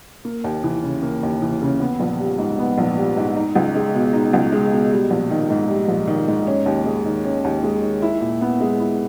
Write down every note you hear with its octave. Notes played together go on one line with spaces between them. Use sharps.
A#3
D#2
E3
C#3
A#3
D#2
E3
C#3
B3
A#1
G3
G#2
B3
A#1
G3
G#2
D#4
C#2
G#3
B2
D#4
C#2
G#3
B2
G3
A#1
D#3
G#2
G3
A#1
D#3
G#2
C#4
D#2
G#3
D#3
C#4
D#2
G#3
D#3
E4
A#2
B3
G#3
E4